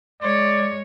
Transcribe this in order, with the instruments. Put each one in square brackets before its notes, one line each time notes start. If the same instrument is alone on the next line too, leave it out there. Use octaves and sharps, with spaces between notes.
[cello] G#3 C#5 [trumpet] D5